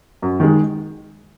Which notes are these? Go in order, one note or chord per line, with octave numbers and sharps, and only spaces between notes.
F#2
D#3 G#3